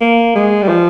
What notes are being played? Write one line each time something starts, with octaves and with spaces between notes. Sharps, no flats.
A#3
G#3
G3
F3